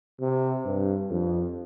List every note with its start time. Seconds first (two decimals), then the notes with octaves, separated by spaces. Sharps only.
0.21 C3
0.65 G2
1.10 F2